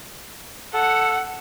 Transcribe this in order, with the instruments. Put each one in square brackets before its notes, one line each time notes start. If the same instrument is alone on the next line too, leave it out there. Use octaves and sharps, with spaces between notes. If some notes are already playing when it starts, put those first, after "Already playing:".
[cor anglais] A4 [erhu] F#5